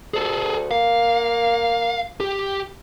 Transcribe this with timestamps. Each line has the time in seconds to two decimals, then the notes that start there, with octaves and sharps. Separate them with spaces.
0.14 D2 G#4 A4
0.71 A#3 F5
2.20 G4